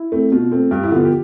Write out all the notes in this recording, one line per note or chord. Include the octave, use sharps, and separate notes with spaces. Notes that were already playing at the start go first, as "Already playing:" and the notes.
Already playing: E4
A3 C4
B2 F4
A3 C4
G2 G4
E4
D3 F3 B3 F4
G4